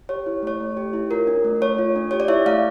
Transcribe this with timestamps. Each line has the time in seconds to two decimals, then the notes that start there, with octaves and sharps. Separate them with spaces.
0.09 G4 C#5
0.26 E4
0.42 A3 C#5
0.61 A3
0.77 G4
0.93 E4
1.11 F4 A#4
1.27 D4
1.44 A3
1.61 A3 C#5
1.78 F4
1.96 D4
2.11 G4 C#5
2.20 D5
2.28 E4 C#5 E5
2.46 A3 D5 F5